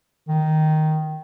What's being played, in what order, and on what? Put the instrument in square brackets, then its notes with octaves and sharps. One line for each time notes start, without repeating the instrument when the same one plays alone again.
[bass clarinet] D#3